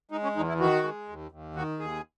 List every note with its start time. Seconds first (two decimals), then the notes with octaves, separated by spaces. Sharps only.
0.11 G#3 D#4
0.23 C#4
0.36 E2 D#4
0.48 E4
0.59 D#3 F#4
0.83 G#3
1.08 D#2
1.31 D#2
1.55 D#3 F#4
1.79 D#2 G#4